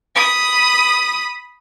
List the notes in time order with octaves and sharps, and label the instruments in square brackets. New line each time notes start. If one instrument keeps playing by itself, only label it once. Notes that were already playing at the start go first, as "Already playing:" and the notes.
[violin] B5 D#6